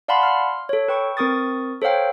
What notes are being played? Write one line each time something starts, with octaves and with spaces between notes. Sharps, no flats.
D5 F5 F#5 A5 B5 C6
C6 F6
A4 C#5
B4 G5 C#6
C4 A#4 C#6 D#6 A6
A4 C5 C#5 F5 G5